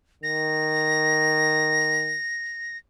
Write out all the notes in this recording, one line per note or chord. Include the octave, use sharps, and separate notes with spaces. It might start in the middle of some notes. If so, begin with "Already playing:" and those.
D#3 A#6